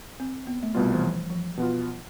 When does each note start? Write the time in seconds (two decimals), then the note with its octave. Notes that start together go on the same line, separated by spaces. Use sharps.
0.20 C4
0.47 B3
0.63 A3
0.75 C2 B2 G3 B3 F4
0.94 E3
1.02 F3
1.30 F3
1.57 B2 B3 F4